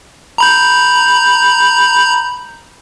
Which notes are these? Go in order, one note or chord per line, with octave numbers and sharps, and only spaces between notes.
A#5 B5 G6